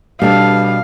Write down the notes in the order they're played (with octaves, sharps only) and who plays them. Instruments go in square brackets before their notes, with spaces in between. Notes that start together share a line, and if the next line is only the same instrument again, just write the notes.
[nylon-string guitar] B2 D4 A4 [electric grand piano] G3 [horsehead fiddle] F5